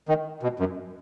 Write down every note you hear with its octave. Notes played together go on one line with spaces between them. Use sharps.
D#3
B2
F#2